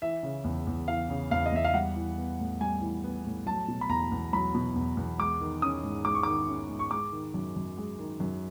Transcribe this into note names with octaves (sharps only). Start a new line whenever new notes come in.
E3 E5
C#3
E2
E2
E3 F5
C#3
E2 F5
D#5
E2 E5
F5
G3 F#5
E3
B3
A2
G3 G#5
E3
B3
A2
F#3 A5
B2
B5
E2 A#5
E2
F#3 B5
B2
E2
E2
G#3 D6
D#3
C#4 D#6
G#2
G#3 D6
C#6
D#3 D6
C#4
G#2
C#6
G#3 D6
D#3
F#2
F#2
G#3
D#3
F#2